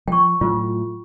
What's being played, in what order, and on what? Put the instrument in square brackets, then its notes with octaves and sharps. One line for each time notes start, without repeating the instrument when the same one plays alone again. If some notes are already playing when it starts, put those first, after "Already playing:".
[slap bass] F3 [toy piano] G5 C#6
[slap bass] A2 F#3 A3 [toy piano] F4